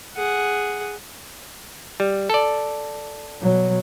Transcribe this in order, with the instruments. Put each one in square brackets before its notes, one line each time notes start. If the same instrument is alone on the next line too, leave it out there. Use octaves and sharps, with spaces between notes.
[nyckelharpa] G#4 F#5
[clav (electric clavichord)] G3
A4 D5
[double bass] B2 F#3